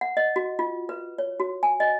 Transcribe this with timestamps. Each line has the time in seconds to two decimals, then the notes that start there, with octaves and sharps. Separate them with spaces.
0.01 F#5
0.17 D#5
0.36 F#4
0.59 F4
0.89 B4
1.18 C#5
1.40 F#4
1.63 G#5
1.80 D#5